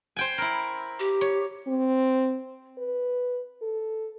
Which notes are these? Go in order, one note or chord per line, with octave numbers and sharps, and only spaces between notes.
C5 G5 G#5
E4 A#4
G4
C#5
C4
B4
A4